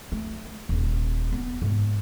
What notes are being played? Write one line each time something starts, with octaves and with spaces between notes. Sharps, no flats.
A3
D#1
B3
G#2